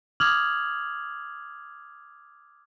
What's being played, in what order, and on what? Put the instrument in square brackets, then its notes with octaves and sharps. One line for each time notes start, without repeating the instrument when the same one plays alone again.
[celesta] D6 D#6 F6 G#6 F7 F#7